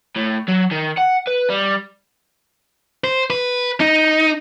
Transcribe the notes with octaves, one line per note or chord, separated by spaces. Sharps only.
A2
F#3
D#3
F#5
B4
G3
C5
B4
D#4